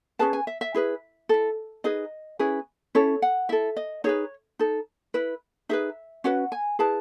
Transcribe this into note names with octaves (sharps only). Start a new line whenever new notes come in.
C#4 G#4 B4 A5
G#5
E5
E5
E4 G#4 B4
E4 A4
D#4 G#4 B4 D#5
C#4 E4 G#4 B4
C#4 E4 A4 C#5
F#5
E4 A4 E5
D#5
D#4 G#4 B4 C#5
D#4 A4
E4 B4
D#4 G#4 B4 E5
C#4 F#4 B4 F#5
G#5
E4 G#4 B4 A5